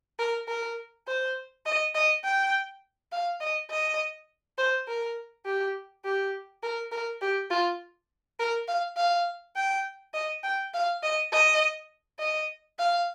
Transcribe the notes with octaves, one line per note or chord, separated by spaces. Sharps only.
A#4
A#4
C5
D#5
D#5
G5
F5
D#5
D#5
C5
A#4
G4
G4
A#4
A#4
G4
F4
A#4
F5
F5
G5
D#5
G5
F5
D#5
D#5
D#5
F5